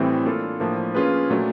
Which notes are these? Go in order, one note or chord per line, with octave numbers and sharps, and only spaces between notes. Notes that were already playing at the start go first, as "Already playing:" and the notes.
Already playing: A2 E3 G3 C4
A#3 D4 F4 A4
A2 F3 A#3 D4
A#3 C#4 F4 G#4 B4
A#2 F#3 A3 D4